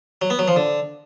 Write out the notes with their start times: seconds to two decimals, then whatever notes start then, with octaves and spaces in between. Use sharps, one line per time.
0.22 F#3
0.30 B3
0.39 F#3
0.48 F3
0.56 D3